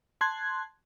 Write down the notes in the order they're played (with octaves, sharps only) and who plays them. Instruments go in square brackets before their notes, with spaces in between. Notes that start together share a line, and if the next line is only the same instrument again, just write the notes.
[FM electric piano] A5 C6 F#6 G#6